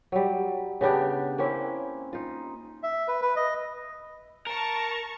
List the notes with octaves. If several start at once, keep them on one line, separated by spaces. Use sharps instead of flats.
F#3 G3
C#3 B3 D4 G4
A#3 C4 C#4 E4
D#4 F4
E5
B4
B4
D#5
A#4 A5 C#6